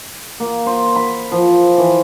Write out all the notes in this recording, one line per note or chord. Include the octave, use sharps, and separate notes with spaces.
A#3
C5
B5
F3
E3